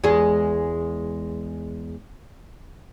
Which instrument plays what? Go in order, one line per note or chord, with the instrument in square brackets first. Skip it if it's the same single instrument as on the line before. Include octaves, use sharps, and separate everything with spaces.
[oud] E2 G#3 G#4